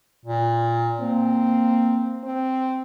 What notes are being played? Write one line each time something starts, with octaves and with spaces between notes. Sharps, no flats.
A#2
A#3 C4
C4